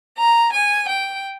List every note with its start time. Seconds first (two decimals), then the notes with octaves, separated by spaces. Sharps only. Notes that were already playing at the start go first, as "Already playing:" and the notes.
0.18 A#5
0.52 G#5
0.88 G5